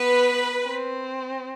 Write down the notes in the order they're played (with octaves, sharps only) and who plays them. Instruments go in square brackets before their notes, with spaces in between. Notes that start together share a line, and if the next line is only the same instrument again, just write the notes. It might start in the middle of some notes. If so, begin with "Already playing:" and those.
Already playing: [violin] B3 [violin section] B4
[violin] C4